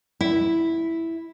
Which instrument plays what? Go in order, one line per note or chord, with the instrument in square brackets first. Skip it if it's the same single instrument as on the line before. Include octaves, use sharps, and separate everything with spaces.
[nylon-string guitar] E4